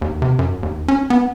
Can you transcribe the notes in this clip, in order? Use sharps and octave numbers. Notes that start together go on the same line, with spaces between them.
D#2
C3
F#2
D#2
C#4
B3